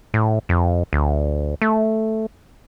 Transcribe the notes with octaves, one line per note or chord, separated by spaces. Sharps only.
A2
F2
D2
A3